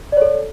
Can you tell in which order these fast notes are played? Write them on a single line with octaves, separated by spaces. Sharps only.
D5 C#5 A4